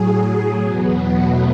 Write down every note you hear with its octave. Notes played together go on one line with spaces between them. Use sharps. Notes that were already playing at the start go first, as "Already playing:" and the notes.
Already playing: A2 F#3 G#4
E2 B2 F#3 B3
A3